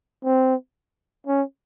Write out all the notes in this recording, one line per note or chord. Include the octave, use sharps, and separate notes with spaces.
C4
C#4